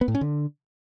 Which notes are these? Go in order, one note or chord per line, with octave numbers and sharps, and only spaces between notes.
B3
A2
C#4
D3